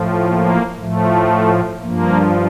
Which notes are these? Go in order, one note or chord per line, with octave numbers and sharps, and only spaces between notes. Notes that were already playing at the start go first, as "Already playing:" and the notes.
Already playing: A2 F3
A#3
A2 F3 A3
G2 F3 A#3